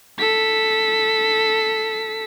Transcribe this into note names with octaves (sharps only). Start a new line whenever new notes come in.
A4 B6